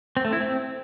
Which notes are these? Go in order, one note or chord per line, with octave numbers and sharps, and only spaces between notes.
C4
A3
E4
C4